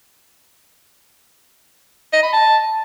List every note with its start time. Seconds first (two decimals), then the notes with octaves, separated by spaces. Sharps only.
2.13 D#5
2.23 B5
2.33 A5